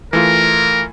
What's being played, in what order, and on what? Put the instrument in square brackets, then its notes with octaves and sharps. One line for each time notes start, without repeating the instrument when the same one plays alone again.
[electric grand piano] E3 A3 F4 [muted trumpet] A#4